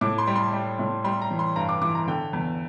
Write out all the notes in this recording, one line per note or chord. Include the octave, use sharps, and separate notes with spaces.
A2 D6
C6
G3
C6
G3
A2
G3 C6
A#5
E3
C6
G2 A#5
D6
E3 D6
A#5
D3 G5
E2